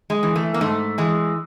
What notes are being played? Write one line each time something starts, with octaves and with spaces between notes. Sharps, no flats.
G#3
E3
A3
A#3
G#2 A3
E3 G#3